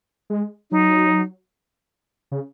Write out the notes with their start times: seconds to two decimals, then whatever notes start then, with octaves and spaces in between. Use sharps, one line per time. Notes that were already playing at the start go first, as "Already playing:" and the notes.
0.30 G#3
0.71 F#3 D#4
2.32 C#3